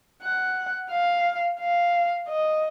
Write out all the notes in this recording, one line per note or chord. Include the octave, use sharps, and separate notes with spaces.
F#5
F5
F5
D#5